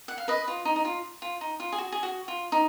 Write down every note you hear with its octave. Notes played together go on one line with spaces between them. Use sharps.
F#5
F5
B4 D#5
F4
D#4
D#4
F4
F4
D#4
F4
G#4
F#4
G#4
F#4
F4
D#4